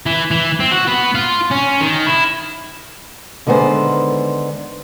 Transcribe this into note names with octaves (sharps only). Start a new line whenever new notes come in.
E3
E3
C4
F#4
B3
F4
C#4
D#3
E4
D3 D#3 G#3 B3 C5